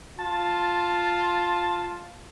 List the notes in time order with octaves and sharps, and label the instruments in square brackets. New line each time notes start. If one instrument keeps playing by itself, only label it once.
[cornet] F4 [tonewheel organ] A5